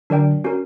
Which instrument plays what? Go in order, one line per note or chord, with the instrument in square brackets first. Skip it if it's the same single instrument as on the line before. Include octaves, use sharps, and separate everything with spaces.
[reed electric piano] D3 F#3 [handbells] D4 A#4 D5 G5
[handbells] C#4 F#4 A#4